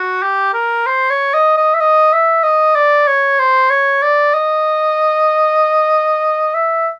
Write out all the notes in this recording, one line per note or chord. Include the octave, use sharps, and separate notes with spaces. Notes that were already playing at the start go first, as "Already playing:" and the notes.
Already playing: F#4
G4
A#4
C5
C#5
D#5
D#5
E5
D#5
E5
D#5
D5
C#5
C5
C#5
D5
D#5
E5